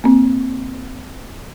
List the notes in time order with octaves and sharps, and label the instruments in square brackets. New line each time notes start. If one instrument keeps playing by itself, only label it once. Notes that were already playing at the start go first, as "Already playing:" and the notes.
[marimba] A#3 C4